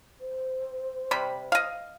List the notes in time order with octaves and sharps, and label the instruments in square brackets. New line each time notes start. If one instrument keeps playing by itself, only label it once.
[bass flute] C5
[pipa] C3 G3 B5
D#5 F5